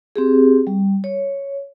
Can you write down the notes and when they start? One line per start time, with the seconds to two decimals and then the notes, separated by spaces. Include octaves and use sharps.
0.16 C4 G4 G#4
0.67 G3
1.04 C#5